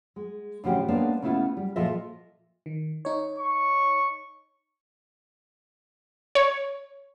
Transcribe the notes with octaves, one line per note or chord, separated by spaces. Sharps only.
G#3
A2 D3 F3 C#4 F#4 G4
G#3 A#3 B3 C#4 D4 A#4
C#3 A3 B3 E4 F4
G3
A#2 F3 F4 A4 D#5 E5
D#3
D#4 C#5
C#6
C#5